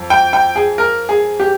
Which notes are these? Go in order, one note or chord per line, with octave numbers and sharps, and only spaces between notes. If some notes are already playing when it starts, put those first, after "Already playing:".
Already playing: F2
G5
G5
G#4
A#4
G#4
G4